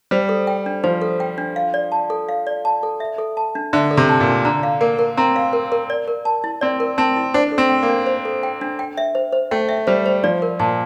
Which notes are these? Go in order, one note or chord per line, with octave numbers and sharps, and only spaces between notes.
G3 C5
A4
G5
D4
F3 C5
A4
G5
D4
F5
D5
A5
A4
F5
D5
A5
A4
E5
A4
A5
D4
D3 E5
A4
C3
A5
A#2
D4
D3 A#5
F5
A#3 A#4
A#4
C4 A#5
F5
A#4
A#4
D5
A#4
A5
E4
C4 D5
A#4
C4 A5
E4
D4 C5
A4
C4
G5
A#3
D4
C5
A4
G5
D4
G5
E5
C5
C5
A3 G5
E5
G3 C5
C5
F3 D5
A#4
A#2 A5